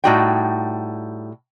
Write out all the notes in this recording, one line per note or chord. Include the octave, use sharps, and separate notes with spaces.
A2 G3 D#4 F#4 C#5 G5